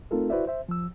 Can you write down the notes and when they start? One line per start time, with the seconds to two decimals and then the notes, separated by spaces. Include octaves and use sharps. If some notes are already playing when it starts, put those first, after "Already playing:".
0.11 A3 C4 D#4 F4 A4 A#4
0.30 E4 F#4 B4 C5 D5 E5
0.47 C5 E5
0.69 F3 E6